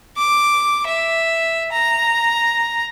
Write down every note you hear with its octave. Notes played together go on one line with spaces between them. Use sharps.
D6
E5
A#5